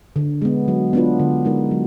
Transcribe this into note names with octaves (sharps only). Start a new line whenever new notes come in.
D3
G#3 B3
F#3
B3 D4 F4 B4
D3
G#3 D#4 A#4
F#3